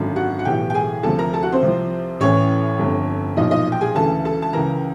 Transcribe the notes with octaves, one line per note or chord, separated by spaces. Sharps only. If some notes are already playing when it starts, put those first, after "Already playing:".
Already playing: G#1 F#2 D3
F#4 F#5
F#5
B1 A2 E3 G4 G5
G5
G#4 G#5
D2 C3 F3 A4 A5
A#4 A#5
A4 A5
F#4 F#5
C4 C5
C2 C3 F3
A1 A2 E3 C#4 C#5
G1 F2 D3
B1 A#2 F3 D#4 D#5
D#4 D#5
G5
G#4 G#5
D2 C#3 E3 A4 A5
A4 A5
A5
C#2 C#3 E3 A#4 A#5